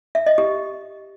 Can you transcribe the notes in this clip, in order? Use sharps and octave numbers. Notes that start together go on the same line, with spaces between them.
E5
D#5
G4